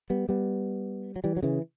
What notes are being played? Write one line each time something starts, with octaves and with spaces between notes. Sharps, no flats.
G3 B3
G3 B3
F#3
E3 G3
F#3
C#3 E3